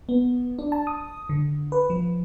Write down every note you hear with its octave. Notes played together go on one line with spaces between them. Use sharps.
B3
D4
A5
D#6
D3
B4
F3